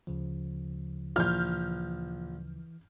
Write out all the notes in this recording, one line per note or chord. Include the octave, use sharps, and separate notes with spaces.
D2 C#3 F3
A#1 E3 F6 G6